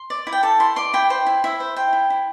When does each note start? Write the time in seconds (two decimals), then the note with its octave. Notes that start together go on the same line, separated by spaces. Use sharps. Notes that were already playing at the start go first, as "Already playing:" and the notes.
Already playing: C6
0.10 D5
0.27 E4
0.33 G5
0.43 A4 A5
0.60 E4 C6
0.76 D5 C6
0.94 E4 G5
1.10 C5 G5
1.26 E4
1.44 E4 E5
1.60 C5
1.76 C5 G5
1.93 E4
2.10 E4